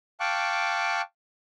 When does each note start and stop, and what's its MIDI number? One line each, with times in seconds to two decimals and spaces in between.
0.20 1.01 77
0.20 1.01 79
0.20 1.01 81
0.20 1.01 85
0.20 1.01 86
0.20 1.01 90